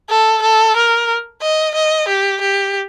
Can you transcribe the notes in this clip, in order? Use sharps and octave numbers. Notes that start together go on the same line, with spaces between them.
A4
A4
A#4
D#5
D#5
G4
G4